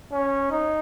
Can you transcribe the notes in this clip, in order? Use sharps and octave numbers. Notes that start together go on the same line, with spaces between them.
C#4
D#4